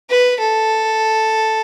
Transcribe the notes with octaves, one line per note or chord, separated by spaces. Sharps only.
B4
A4